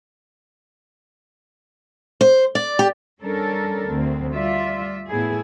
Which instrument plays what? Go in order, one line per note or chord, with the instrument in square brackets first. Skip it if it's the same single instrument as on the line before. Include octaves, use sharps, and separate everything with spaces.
[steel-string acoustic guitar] C5
D5
G4
[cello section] G3 C#4 D4 A4 A#4
D2 C4
G3 F4 D5 E5
A2 B3 E4 G#4